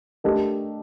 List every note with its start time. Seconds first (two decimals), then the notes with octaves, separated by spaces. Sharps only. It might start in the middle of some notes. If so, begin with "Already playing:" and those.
0.24 A3 D4 G4 A#4 D#5